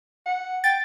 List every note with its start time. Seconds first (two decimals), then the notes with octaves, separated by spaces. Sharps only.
0.26 F#5
0.64 G5 A6